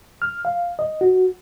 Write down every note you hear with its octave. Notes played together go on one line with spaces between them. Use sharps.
F6
F5
D#5
F#4